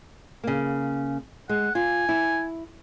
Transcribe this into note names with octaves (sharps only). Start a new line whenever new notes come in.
C#3 A#3
G#3 F#5
F4 G#5
E4